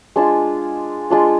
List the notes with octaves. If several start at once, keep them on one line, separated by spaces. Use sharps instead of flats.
G#3 D4 F4
G#3 D4 F4